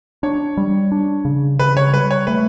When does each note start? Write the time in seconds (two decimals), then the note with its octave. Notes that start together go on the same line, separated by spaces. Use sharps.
0.23 D4 C#5
0.57 G3
0.92 D4
1.25 C#3
1.59 C#3 B4
1.77 C#5
1.93 G3 B4
2.11 C#5
2.27 A3 B4